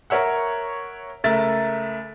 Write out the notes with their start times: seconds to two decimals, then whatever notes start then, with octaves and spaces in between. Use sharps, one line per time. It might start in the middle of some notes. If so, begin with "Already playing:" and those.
0.10 A#4 C#5 E5 F#5
1.24 C#2 A3 A#4 E5 A6